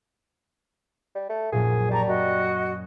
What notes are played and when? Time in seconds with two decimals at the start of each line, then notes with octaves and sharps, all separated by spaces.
1.15 G3
1.29 A3
1.52 A#1 F#2 A#2 G#4
1.91 G3 D5 A5 A#5 C#6
2.07 F#2 F#4 D#5
2.45 G#5 B5 D#6